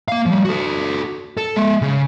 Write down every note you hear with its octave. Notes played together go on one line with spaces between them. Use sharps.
A#3 F5
F3 G3
F#4 A4
A4
G#3 E5
C#3